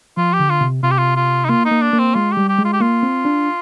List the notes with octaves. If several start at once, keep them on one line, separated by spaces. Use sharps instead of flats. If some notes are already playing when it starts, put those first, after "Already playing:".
F3 F4
G4
D3
F4
C3
C3 F4
G4
F4
F4
D#4
A#3 F4
D#4
A#3
D4
A#3
C4
G#3 F4
G4
G3
G4
G#3
F4
G4
A#3 F4
C4
D4